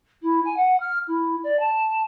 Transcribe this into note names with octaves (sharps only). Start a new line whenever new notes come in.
E4
G#5
F#5
F6
E4
D5
A5